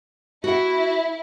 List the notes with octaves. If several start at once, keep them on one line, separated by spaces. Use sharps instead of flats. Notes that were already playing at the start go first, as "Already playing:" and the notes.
E4 F#4 F#5